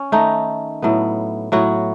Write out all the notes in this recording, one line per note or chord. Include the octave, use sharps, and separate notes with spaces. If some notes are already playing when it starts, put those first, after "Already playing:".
Already playing: C#4
D#3 A3 D#4
A2 F#3 B3
A2 F#3 B3 F#4